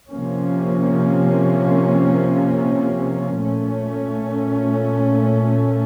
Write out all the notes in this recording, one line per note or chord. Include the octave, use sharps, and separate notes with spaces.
C3 F3 A#3 C#4
A#2 A3 C#4